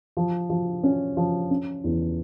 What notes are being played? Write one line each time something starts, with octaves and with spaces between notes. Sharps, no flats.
F3
F3
C#4
F3
C#4
E2